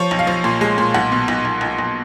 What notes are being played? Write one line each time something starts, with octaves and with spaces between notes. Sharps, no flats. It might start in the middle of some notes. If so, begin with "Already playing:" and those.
Already playing: F3 C#5
B1
F5
F3
A#2
G#3
A#2
B1 F#5
B2
B1
B1
B1
B1